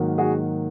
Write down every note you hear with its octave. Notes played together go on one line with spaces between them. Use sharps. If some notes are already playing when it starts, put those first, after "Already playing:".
Already playing: G#2 D#3 F#3 A#3
F#4 G#4